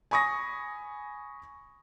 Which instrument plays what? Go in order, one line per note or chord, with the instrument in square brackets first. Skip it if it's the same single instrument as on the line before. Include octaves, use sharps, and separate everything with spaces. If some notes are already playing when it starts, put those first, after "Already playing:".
[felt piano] G#5 B5 C#6 D#6 A#6